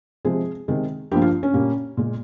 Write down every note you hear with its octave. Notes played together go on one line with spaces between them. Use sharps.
C3 F3 G#3 G#4
C3 D#3 G#3
G2 F3 A#3 G4
F4
C#4
A#2 G3 A#3
A#2 G#3